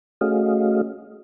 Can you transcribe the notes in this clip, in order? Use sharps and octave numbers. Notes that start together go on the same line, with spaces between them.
A3 C#4 F#4 G#4 D#5 F5